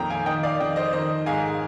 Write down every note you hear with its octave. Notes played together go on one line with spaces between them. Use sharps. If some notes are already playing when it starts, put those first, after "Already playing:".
Already playing: F2 A#2 D#3 G5 A#5
F5 G#5
D#3 D#5 G5
D5 F5
F2 D#5 G5
C5 D#5
D#3 C5 D#5
G#2 F5 G#5